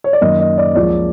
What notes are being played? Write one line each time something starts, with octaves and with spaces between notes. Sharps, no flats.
C#5
D5
F#2 D#3 F#3 A#3 D#5
D#5
D5
C#2 C#3 F3 A#3 D5